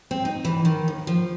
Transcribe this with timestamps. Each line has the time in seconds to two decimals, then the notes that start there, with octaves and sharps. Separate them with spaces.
0.11 C4
0.25 D#4
0.45 E3
0.65 D#3
0.88 D#2
1.07 F3